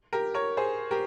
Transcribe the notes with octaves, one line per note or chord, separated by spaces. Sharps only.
G4 A#4
A#4 C#5
G#4 C5
G4 A#4